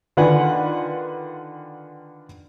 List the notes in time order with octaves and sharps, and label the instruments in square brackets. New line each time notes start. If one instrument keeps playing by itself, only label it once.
[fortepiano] D3 D#3 F4 B4 F#5 G#5